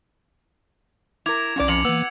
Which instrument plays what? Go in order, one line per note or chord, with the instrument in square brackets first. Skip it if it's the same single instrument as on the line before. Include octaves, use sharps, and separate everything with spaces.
[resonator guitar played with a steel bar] E4 A#4 [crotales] D6 G#6 F7
[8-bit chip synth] B1 C#4 [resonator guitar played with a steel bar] G2 F#4 D5
[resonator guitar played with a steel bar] F2 [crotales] C#7 F7 F#7
[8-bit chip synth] E3 A#3 [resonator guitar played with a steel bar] B3 [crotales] E6 F#7